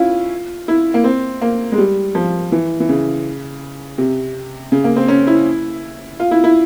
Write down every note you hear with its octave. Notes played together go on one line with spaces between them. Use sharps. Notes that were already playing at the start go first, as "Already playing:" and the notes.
Already playing: C#4 E4 F4
E4
A#3
C4
A#3
G#3
G3
F3
E3
E3
C#3
C3
C#3
A#3
C4
C#4
E4
F4
E4
E4